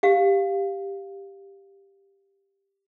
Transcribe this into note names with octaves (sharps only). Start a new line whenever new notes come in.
G4 F5